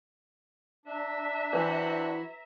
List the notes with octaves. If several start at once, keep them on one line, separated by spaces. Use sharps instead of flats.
D4 E5 A#5
E3 C4 E4 F#4